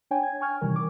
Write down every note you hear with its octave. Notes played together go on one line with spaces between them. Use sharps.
D4 C#5 G5 G#5
G#6
G#5 C#6 F6 G#6
C3 D#3 E3 G3 A#4
D6